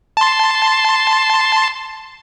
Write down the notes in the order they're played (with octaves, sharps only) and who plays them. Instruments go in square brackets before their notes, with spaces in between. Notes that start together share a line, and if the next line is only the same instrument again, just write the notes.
[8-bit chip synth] A5 C6